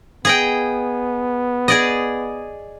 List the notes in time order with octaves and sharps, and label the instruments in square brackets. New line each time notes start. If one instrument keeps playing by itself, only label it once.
[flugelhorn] B3 [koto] G#4 D#5 G5
[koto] G#4 D5 D#5